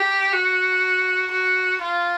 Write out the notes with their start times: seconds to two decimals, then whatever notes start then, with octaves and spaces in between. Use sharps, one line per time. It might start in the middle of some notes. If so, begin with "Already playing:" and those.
Already playing: G4
0.33 F#4
1.32 F#4
1.81 F4